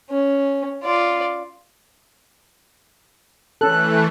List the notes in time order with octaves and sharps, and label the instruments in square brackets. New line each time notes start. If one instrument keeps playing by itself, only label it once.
[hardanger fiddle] C#4
F4 D5
[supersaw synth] E3 A3 [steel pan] C#4 A4 [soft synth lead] F#6